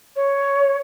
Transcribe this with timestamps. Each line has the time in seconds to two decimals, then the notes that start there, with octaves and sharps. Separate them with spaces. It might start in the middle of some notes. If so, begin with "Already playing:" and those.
0.16 C#5